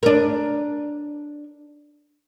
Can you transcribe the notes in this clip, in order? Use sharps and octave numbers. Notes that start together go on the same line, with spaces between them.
D4 A#4